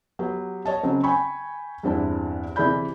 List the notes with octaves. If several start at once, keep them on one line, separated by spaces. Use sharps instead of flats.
F#3 B3 G4
C#5 D#5 A5
C#3 F#3 C4
G5 G#5 B5 C#6
E2 G2 C4 D4 E4
C3 E3 G#4 D5 B5 G6